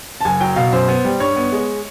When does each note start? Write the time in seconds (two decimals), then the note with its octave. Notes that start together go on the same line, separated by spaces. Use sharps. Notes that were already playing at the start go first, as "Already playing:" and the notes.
0.21 A5
0.25 F#1 G#5
0.40 F#3 G5
0.56 B2 F5
0.72 F#2 C5
0.88 B3
1.05 G3
1.20 G2 C#5
1.36 B3
1.52 G#3